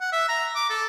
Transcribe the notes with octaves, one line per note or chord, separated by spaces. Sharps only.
F#5
E5
A#5
D6
A4